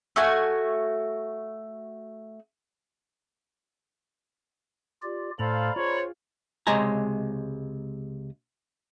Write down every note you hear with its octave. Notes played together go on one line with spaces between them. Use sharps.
A3 F#4 G#5
F4 G4 D5
A2 A4 C5 D5 F5 A#5 B5
F4 G#4 C5 C#5
C#2 C3 G#3 C#5 G#5 A#5